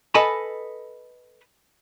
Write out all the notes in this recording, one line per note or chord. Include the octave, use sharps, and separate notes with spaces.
A4 B4 D#5 G#5 A5 B5